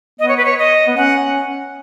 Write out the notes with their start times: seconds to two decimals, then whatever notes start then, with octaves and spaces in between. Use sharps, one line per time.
0.19 B3 D#5
0.28 C#5
0.37 B4
0.45 C#5
0.59 D#5
0.88 B3
0.97 C#4 F#5